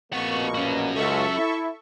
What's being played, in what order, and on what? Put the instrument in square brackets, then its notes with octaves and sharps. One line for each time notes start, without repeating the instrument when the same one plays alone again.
[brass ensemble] A#1 B2 A#3 [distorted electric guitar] C4 F#5 [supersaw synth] C#6
[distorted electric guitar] C#4 F#4
[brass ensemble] C#2 [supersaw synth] A4 E5 C#6
[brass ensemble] E4